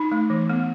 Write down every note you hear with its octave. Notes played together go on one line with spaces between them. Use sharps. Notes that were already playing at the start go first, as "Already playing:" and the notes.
Already playing: D#4
A3
E3
B3